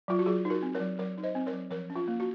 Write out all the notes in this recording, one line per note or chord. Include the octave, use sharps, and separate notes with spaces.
F#3 F4
F#4
F#3 F4 G#4
D#4
F#4 A#4
C4
A#4 C#5
F#3
F#3 A#4 C#5
D#4
C5 D#5
C4
A#4 C#5
F#3
F3 A#4 C#5
C#4
F4
A#3
F#4